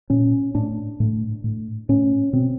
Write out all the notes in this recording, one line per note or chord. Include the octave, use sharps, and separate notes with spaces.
A#2 C#4
A2 D4
A2
A2
A2 C#4
B2 C4